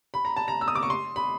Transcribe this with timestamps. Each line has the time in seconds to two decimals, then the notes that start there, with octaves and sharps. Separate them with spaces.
0.14 B5
0.25 A#5
0.36 A5
0.48 A#5
0.61 E6
0.68 D#6
0.75 D6
0.83 C#6
0.90 C6
1.16 B5